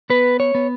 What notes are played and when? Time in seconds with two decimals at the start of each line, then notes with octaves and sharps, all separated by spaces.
0.10 B3 B4
0.40 C#5
0.55 B3